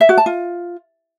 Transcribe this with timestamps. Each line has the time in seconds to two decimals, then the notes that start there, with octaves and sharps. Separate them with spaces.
0.01 E5
0.09 F#4
0.18 A5
0.26 F4